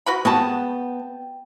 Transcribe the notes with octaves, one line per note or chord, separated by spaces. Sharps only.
F#4 B4 B5
G3 B3 F#4 G#4 G5 A5